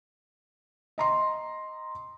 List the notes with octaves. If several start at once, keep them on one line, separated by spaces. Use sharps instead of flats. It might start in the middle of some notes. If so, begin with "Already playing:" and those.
D#5 A#5 C6